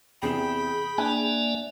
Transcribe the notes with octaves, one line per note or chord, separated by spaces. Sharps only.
E2 C3 G#4 G5 B5 E7
A#3 D4 D5 E5 G#5 F#6